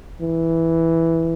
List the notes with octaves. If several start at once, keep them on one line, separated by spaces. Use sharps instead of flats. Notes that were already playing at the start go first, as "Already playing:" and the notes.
E3